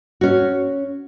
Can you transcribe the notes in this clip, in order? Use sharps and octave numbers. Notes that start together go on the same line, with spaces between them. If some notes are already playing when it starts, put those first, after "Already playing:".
C#4 F#4